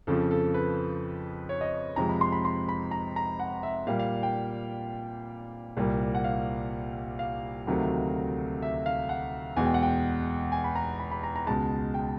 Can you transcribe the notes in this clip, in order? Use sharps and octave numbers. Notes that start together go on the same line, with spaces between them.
F2 C#3 F3 A4
A4
B4
C#5
D#5
F2 C3 F3 G#3 A#5
B5
C6
B5
C6
B5
A#5
A#5
F#5
E5
A#2 G3 F5
F5
G5
C2 A#2 G3
F#5
F5
F5
D2 C3 D#3 F#3 A3
E5
F5
F#5
E2 B2 G#3 G#5
G5
F#5
G5
G#5
B5
A#5
B5
B5
A#5
A#5
C#2 B2 G#3 A5
G5